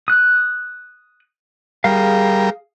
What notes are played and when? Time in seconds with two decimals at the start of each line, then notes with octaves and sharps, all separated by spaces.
0.08 D#6 F#6
1.84 G3 G#4 A#4 F5